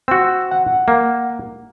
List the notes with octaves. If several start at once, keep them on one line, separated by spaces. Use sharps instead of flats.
C4 F#4 E6
F#5
A#3